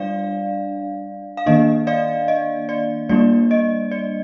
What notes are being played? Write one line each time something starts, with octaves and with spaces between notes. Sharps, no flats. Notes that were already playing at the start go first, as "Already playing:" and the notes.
Already playing: G3 D4 D5 F5
F5
D#3 A#3 D4 D#5
D5 F5
D#5
D5
G3 A#3 D4 D5
D#5
D5